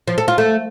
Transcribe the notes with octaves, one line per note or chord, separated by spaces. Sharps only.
F3
A4
F4
A3